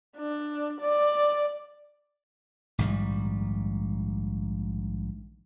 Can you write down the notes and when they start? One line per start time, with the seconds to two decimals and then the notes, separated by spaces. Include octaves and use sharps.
0.16 D4
0.81 D5
2.78 A#1 G#2 D#3 G3